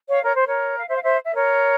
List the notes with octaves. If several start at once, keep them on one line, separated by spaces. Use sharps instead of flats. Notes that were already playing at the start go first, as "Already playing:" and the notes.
C#5 F5
A#4 C#5
C5
A#4 C#5
F5
C5 E5
F5
C5 E5
E5
A#4 C#5